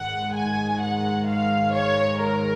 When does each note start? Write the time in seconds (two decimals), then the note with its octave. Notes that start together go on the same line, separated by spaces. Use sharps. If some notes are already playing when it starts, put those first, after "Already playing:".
Already playing: G#2 D#3 G#3 F#5
0.34 G#5
0.81 F#5
1.28 F5
1.74 C#5
2.21 A#4